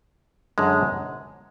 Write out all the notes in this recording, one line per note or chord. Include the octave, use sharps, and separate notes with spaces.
F#2 D3 G#3